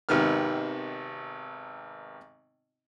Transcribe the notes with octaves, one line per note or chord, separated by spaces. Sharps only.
G#1 C3 D#3 B3 F6